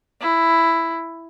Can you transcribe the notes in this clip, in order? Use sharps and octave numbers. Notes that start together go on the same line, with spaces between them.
E4